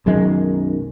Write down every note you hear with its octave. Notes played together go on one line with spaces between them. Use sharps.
B1 F#2 D#3 G#3